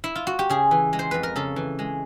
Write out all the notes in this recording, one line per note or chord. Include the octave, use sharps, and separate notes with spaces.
E4
F4
F#4
G4
C#3 G#4
E3
G#3
C5
F2 B4
A#4
C#3 A4
E3
G#3